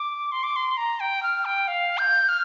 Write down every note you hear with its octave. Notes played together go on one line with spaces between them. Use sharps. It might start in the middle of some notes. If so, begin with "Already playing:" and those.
Already playing: D6
C6
D6
C6
A#5
G5
F6
G5
F5
G6
F6